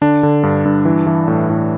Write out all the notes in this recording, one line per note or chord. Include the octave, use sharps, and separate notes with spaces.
D3 D4
D3
G2
G2
E3
E3
A2
A2